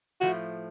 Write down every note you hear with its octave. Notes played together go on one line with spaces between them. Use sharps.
A2 F3 A3 F#4